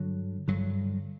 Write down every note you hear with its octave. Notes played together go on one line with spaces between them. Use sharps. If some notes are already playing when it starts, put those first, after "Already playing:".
Already playing: G2 D3 F#3
G2 D3 F#3